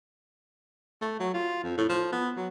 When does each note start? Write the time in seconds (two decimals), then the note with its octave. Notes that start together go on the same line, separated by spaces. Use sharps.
1.01 A3
1.20 F#3
1.34 F4
1.64 F2
1.77 A2
1.89 F3
2.12 B3
2.37 F#3